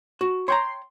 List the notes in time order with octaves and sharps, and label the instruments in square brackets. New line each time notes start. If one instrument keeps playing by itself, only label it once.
[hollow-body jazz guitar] F#4
[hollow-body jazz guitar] C#5 G5 A#5 [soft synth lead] C6